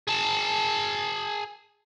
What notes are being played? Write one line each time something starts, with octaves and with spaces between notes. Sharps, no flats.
G#4 A5